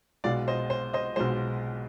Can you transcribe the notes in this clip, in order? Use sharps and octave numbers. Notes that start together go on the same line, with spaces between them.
B1 B2 G#3 D5 F5
C5 D#5
C5
C5 D#5
B1 B2 G#3 C5